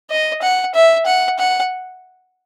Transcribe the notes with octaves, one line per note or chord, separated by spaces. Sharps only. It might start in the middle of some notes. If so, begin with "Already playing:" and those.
D#5
F#5
E5
F#5
F#5